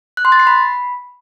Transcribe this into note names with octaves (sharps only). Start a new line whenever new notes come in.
F#6
C6
A6
C7
B5